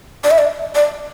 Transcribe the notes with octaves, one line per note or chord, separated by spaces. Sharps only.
D5
E5
D5
D5